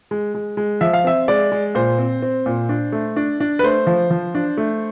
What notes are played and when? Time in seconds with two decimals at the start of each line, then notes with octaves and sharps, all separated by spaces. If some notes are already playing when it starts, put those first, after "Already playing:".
0.11 G#3
0.34 G#3
0.57 G#3
0.81 F3 E5
0.93 F5
1.04 C4 E5
1.28 G#3 D5
1.52 G#3
1.75 A#2 C5
1.99 C4
2.22 C4
2.46 A#2
2.69 D4
2.92 A3
3.16 D4
3.40 D4
3.59 B4
3.63 A3 C5
3.87 F3
4.10 F3
4.35 D4
4.57 A3